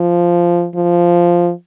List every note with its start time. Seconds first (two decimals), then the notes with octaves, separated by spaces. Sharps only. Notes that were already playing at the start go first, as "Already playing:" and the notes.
Already playing: F3
0.75 F3